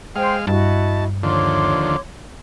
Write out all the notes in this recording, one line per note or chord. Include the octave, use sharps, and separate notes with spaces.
G#3 C5 F5 G5 C6
G2 E4 F#4 D#5 A5
D#2 D3 F3 C#5 C6 D6